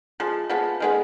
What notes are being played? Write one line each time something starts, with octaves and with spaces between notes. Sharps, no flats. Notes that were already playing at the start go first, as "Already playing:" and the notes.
F3 G#3
F3 G#3 B3
D#3 G#3 B3